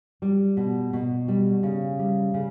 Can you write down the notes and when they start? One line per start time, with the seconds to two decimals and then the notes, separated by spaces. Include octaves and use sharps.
0.22 G3
0.57 B2
0.93 B2
1.28 G3
1.63 C#3
1.99 G3
2.34 C#3